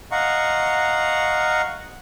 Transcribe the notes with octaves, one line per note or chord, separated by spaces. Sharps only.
D#5 F5 F#5 A#5 C#6